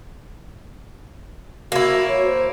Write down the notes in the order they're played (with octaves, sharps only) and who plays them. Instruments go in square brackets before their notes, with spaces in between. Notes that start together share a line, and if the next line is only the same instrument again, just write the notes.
[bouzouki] A#3 E4 [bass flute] F#4
[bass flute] C#5
C5